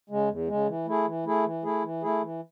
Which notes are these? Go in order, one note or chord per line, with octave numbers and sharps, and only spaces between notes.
C#3 G#3
E2
C#3 G#3
E3
A3 E4 G#4
E3
A3 E4 G#4
E3
A3 E4 G#4
E3
A3 E4 G#4
E3